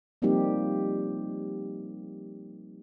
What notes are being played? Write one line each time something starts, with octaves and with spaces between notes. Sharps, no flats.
F3 G3 A#3 C4 D#4 G4